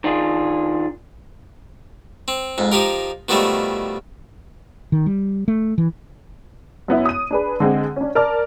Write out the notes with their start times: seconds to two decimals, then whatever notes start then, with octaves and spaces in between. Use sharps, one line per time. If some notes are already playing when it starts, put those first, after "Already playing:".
0.04 D#3 D4 F4 G#4
2.28 C4
2.58 F2 G#2
2.72 F3 D#4 G4 A#4
3.29 B2 D#3 F3 G3 A3
4.92 D#3
5.06 G3
5.48 A3
5.78 E3
6.88 F#2 B3 E4
7.05 D#6 D#7
7.31 D4 G#4 B4
7.60 D3 G#3 C4
7.96 C#4 D4
8.15 A#4 D5 A5 F6